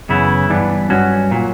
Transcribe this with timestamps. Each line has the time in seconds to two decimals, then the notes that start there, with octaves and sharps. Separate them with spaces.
0.09 F#2 C#3 E3 B3 E4
0.49 G2 E3 B3 D4
0.90 G2 F#3 C#4 F#4
1.31 A#2 F#3